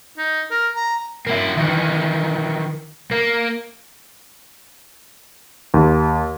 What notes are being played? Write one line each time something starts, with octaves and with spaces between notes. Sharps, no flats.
D#4
A#4
A#5
A#3 E4
D#3 E3
A#3
D#2